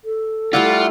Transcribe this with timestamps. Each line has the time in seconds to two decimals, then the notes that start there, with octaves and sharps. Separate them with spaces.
0.04 A4
0.53 G3 A3 E4 F4 D5 F#5